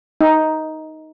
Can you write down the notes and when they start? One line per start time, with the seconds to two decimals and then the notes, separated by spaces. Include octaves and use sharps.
0.21 D#4